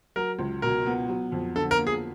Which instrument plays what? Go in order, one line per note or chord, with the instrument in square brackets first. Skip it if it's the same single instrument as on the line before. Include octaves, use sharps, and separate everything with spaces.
[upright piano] F#3 [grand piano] A#4
[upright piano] C#2
[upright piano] B2 [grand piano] A#4
[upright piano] B3
F#3
F2
[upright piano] D3 [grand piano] A4
[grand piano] A#4
[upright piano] A#3
[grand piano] G#4